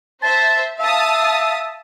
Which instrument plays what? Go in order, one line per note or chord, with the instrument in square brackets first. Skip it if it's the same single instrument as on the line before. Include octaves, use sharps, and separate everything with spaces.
[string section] C5 E5 [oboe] A5
[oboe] E5 [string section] F5 A5 D#6